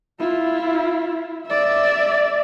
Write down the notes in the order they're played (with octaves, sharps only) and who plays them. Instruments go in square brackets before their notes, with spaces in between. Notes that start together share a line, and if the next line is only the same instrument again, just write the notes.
[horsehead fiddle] E4 F4
D5 E5